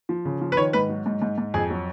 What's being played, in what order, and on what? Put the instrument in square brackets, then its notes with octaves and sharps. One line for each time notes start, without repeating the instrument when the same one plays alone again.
[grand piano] F3
C#3
F3
B4
D#3 C#5
G#2 B4
F#3
G#2
G#2
G#2
F2 G#4
F#3